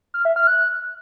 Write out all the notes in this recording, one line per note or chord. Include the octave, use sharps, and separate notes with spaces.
F6
E5
F6
F#6